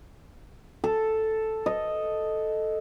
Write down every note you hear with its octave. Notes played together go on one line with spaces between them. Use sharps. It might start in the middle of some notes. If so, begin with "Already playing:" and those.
A4
D#5